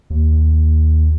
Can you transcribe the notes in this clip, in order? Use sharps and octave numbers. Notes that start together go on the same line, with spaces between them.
D#2